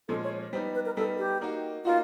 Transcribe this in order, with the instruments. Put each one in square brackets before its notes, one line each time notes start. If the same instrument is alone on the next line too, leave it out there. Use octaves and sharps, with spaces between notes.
[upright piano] A#2 F3 G#3 C#4 [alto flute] A4
[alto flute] C#5
[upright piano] G3 B3 D#4 [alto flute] C5
[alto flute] B4
A#4
[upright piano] G3 B3 D#4 [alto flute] A4
[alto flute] G4
[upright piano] A#3 D#4 F#4
[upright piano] A#3 D#4 F#4 [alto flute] F4